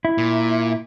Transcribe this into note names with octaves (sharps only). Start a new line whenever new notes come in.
E4
A#2